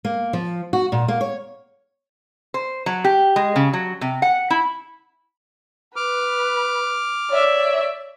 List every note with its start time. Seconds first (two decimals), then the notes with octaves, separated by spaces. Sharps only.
0.05 A#3
0.33 F3
0.73 F#4
0.92 A#2
1.08 A#3
1.21 C#5
2.54 C5
2.86 F#3
3.04 G4
3.36 G#3
3.56 C#3
3.73 F#3
4.01 C3
4.22 F#5
4.50 E4
5.96 B4 D6 F6
7.31 C#5 D5 E5